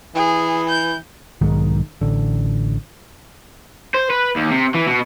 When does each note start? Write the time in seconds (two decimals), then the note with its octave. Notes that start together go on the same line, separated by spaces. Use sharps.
0.15 E3 G#4
0.69 G6
1.41 B1 G#2 D#3
2.01 A1 D3
3.94 C5
4.10 B4
4.36 D#2
4.51 C3
4.75 E3
4.87 B2